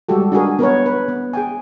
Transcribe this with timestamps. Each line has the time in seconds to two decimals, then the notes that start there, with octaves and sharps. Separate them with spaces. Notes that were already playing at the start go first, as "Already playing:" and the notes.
0.09 G3 G#3 F#4 G4 A4
0.32 D4 F#4 G#4 A#4
0.59 B3 A#4 B4 C#5
0.86 B4
1.08 B3
1.33 G#4 G5 G#5